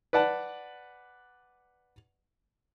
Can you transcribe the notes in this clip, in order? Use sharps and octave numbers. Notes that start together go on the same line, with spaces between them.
B4 D5 F#5 A5